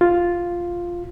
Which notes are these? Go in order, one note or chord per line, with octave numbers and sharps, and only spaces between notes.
F4